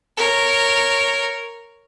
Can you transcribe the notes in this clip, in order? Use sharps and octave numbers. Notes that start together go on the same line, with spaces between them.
A#4 C#5